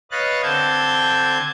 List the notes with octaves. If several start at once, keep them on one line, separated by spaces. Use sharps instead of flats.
B4 C#5 D#5 F5 F#6 A6
D3 C4 A5 G6 G#6